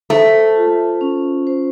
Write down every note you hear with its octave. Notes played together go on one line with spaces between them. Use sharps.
A3 C5
F4
C#4
C5